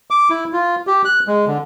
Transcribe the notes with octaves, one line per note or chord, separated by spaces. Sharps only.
D6
E4
F4
G4
F#6
G#3
D3